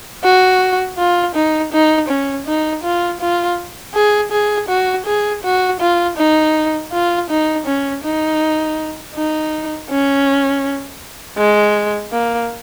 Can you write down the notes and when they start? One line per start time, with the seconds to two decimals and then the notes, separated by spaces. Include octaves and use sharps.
0.24 F#4
0.98 F4
1.35 D#4
1.73 D#4
2.09 C#4
2.47 D#4
2.84 F4
3.21 F4
3.94 G#4
4.32 G#4
4.69 F#4
5.06 G#4
5.44 F#4
5.80 F4
6.18 D#4
6.93 F4
7.30 D#4
7.66 C#4
8.04 D#4
9.15 D#4
9.90 C#4
11.38 G#3
12.12 A#3